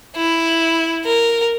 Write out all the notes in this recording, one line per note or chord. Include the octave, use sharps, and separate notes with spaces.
E4
A#4